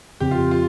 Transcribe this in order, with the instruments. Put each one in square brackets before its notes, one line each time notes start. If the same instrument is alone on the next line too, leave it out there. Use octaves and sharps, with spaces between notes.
[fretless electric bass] F2 C#3 F3 C4 [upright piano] G4
[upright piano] F4
F4